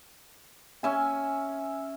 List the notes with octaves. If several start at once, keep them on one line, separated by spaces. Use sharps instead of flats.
C#4 E5 G#5